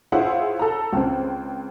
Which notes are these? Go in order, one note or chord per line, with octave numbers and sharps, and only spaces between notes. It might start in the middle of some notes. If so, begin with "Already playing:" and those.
E4 F4 G#4 C5 C#5 F#5
A4 A#5
C#2 C4